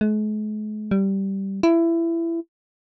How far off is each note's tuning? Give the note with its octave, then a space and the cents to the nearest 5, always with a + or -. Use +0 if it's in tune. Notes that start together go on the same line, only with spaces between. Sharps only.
G#3 +45
G3 -10
E4 +20